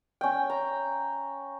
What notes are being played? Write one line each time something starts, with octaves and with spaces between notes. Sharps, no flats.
C#4 G5
A#5